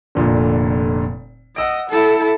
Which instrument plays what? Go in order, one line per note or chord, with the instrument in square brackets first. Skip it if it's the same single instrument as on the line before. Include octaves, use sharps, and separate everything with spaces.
[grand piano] F1 A#2 D3
[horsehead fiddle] D#5 [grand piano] F#5 E6 D7
[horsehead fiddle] E4 A4